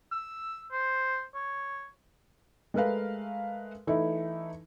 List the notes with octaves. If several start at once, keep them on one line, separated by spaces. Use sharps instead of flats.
E6
C5
C#5
G#3 A3 A#4 B4 F5
E3 A3 D#4 E4